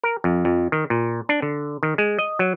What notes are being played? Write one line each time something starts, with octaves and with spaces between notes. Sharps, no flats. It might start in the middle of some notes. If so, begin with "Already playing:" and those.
A#4
F2
F2
D#3
A#2
D4
D3
D#3
G#3
D#5
F#3